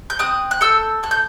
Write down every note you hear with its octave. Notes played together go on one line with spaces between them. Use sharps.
G6
C4 D#6 F#6
F#6
A4 E6 G6
A4 F#6
G6